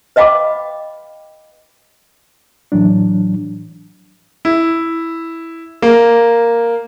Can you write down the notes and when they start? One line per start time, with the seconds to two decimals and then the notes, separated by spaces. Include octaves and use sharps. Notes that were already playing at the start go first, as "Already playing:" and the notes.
0.16 B4 D#5 F5 G5 B5 D6
2.72 A2 E3 F#3 D4
4.45 E4
5.82 A#3